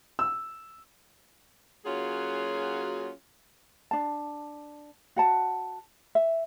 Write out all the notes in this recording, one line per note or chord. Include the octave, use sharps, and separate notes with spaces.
E6
F#3 A#3 C#4 F4 F#4 G#4
D4 A5
F#4 F#5 A5
E5